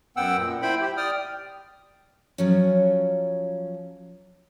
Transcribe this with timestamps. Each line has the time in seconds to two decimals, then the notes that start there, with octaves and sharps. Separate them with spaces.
0.17 F#2 B3 F#5 G5 E6
0.38 A#2
0.62 E4 C5 G5 B5
0.81 G4
0.97 D5 G5 D#6 F6
2.38 F3 F#3 C#4